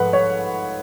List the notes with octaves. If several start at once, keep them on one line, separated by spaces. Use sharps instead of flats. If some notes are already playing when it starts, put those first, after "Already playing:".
Already playing: G#2 F3 A3 B4 F#5
C#5